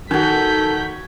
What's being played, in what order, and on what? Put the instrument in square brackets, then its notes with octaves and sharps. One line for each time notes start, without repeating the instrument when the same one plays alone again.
[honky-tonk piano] D#3 [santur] F#4 G#5 [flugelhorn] A4 [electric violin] G6 B6